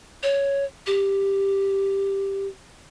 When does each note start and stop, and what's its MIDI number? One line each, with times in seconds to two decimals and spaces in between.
0.23 0.64 73
0.87 2.47 67